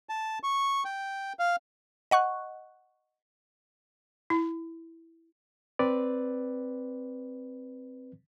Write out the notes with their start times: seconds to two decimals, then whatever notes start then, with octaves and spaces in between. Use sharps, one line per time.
0.09 A5
0.43 C#6
0.85 G5
1.39 F5
2.11 D#5 F#5 C#6 F#6
4.30 E4
5.79 C4 B4 D5